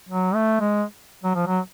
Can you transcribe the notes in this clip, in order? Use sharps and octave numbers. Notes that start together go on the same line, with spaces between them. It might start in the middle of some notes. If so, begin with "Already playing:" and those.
F#3
A3
G#3
F#3
F3
F#3